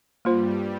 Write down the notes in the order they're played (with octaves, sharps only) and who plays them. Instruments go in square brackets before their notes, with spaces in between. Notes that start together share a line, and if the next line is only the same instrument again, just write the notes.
[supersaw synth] G2 G3 [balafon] A#3 F4 C5